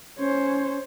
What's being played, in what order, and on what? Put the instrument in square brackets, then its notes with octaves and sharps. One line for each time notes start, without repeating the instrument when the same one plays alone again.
[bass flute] C#4 [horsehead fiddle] C5 C#5